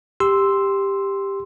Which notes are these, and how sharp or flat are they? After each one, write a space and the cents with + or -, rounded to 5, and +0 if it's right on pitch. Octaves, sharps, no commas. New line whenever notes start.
G4 +10 C6 +0 E6 +0